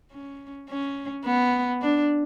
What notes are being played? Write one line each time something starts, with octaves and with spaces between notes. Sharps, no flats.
C#4
C#4
B3
D4